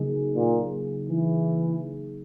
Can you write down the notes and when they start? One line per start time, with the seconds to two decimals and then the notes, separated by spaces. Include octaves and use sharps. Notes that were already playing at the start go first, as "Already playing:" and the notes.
Already playing: C#3 F#3 A#3 D#4 G#4
0.36 A#2
1.10 E3